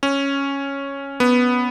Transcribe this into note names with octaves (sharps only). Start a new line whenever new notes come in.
C#4
B3